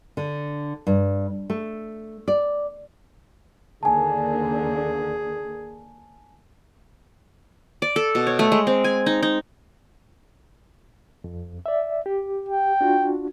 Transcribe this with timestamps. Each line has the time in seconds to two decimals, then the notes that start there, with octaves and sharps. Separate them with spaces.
0.17 D3
0.87 G2
1.50 A3
2.28 D5
3.83 D#2 D3 A#3 G#4 G#5 A5
7.82 D5
7.96 A4
8.15 B2
8.27 C#5
8.39 A3
8.52 G#3
8.67 C4
8.84 G#5
9.06 D#4
9.23 D#4
11.24 F2
11.66 D5 E5
12.06 G4
12.49 G5
12.81 D4 F4 F#4